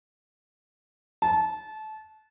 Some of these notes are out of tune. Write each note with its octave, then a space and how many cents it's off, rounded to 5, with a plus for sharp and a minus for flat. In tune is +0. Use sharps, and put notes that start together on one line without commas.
A5 -25